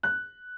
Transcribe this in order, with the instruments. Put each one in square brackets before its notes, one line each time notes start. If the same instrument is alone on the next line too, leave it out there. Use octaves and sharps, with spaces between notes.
[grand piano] F#6